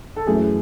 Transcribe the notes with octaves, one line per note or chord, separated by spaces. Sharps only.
A4
F#2 E3 A3 G#4